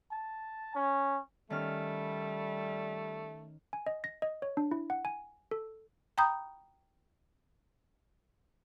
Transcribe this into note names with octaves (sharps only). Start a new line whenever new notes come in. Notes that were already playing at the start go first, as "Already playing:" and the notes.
A5
C#4
D#3 G3 A3 C#4 F6
G#5
D#5
A#6
D#5
C#5
D4
E4
F#5
G#5
A4
G5 A#5 B5 D#6 G6